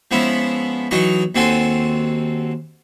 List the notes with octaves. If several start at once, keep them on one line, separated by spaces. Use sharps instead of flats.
F3 G#3 B3 C#4 E4
E3 F#3 D#4 D#5 C#6
D#2 C4 F#4 A4 G#5 C6